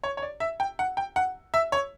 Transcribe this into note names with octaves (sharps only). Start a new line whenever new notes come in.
C#5
C#5
D5
E5
G5
F#5
G5
F#5
E5
C#5